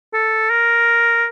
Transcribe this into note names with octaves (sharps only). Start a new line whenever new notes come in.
A4
A#4